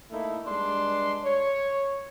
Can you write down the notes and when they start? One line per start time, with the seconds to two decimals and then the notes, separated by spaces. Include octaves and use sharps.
0.11 A3 A#3 D#4 E4
0.45 G2 G#3 D4 C6
1.24 C#5